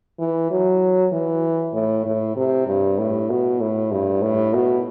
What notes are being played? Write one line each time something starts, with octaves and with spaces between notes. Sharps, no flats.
E3
F#3
E3
A2
A2
C3
G2
A2
B2
A2
G2
A2
B2